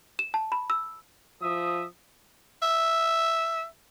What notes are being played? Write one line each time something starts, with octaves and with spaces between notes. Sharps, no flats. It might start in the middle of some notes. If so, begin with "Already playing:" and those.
E7
A5
B5
E6
F3 E5 D#6
E5